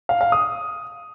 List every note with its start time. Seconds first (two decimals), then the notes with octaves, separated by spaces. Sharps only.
0.09 F5
0.21 F5
0.32 D#6